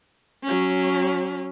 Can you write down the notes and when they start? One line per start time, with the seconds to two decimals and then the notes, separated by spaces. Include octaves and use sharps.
0.43 F#3 C#4